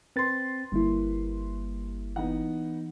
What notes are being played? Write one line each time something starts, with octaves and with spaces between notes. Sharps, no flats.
C4 B4 C6 A6
G1 G3 A#3 E4
E3 B3 D#4 F#5